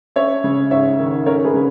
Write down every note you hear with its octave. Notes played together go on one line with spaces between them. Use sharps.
C#4 C#5 E5
C#3
G#2 C#5 E5
D#3
C#4 A#4 C#5
G#4 B4
C#3